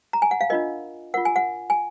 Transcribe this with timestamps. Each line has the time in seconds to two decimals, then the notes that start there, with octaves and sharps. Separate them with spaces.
0.13 A#5
0.22 G#5
0.31 F#5
0.41 F5
0.50 D4 F4 A#4 D#5
1.14 A#4 F#5
1.17 F4
1.25 G#5
1.36 F#5
1.70 G#5